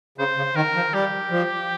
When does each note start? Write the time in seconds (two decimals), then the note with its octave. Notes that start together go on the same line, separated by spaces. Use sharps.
0.18 C#3 C5
0.37 C#3
0.55 D#3 A#4
0.75 F3
0.94 G3 G4
1.31 F3